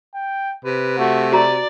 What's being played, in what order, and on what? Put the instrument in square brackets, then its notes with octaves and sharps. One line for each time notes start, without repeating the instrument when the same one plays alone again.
[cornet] G5
[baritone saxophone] C3 [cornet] B4
[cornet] A3 [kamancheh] F#4
[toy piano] F#4 A#5 [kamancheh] D5